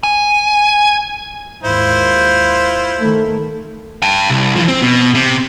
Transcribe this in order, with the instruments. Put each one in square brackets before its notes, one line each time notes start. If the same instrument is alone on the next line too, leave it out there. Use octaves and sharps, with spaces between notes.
[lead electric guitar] G#5
[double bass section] D#2 G#2 [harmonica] E4 F4 C5
[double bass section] D#3 A3
[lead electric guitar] G5 A5
C2
E3 F3
C4
B2
C3